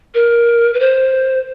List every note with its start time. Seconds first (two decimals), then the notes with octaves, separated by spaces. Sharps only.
0.15 A#4
0.74 B4
0.80 C5